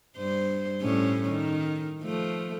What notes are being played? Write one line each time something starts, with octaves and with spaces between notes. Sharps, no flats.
G2 C5
A2 G3 C#4
D#3
F3 A3